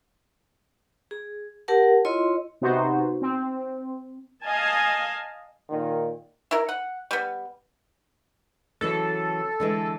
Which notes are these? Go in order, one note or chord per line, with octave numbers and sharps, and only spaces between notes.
G#4
G4 A#4 F#5 A5
E4 F4 C#5 D#5 C6
C3 B3 D#4 F#4 C5
C4
D#5 F5 G#5 A5
A#2 D#3
E4 A#4
F#5
G3 B3
C#3 E3 F#3 A4
D3 E3 G#3